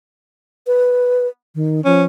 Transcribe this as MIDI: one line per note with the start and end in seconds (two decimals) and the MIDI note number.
0.67 1.27 71
1.55 1.80 51
1.85 2.06 53
1.85 2.04 61